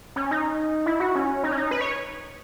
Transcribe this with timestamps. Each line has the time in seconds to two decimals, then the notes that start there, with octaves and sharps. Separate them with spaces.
0.16 C#4
0.31 D#4
0.86 E4
1.00 F#4
1.15 C#4
1.44 D#4
1.52 C#4
1.57 D#4
1.71 B4
1.81 C#5